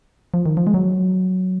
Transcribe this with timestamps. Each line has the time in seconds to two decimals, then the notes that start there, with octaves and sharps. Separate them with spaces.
0.34 F3
0.46 D#3
0.57 F3
0.67 G#3
0.74 F#3